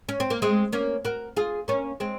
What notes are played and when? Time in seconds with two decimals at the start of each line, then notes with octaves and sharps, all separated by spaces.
0.09 C#4
0.20 C4
0.30 A#3
0.42 G#3 C4
0.72 A#3 C#4
1.05 F#4 A#4
1.37 F4 G#4
1.68 A#3 C#4
2.00 G#3 C4